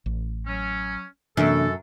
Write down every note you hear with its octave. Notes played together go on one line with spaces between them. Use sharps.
A1
F#3 C#4
F#2 C3 E3 A#3 D4 A4